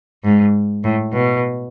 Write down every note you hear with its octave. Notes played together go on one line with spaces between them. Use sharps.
G#2
A2
B2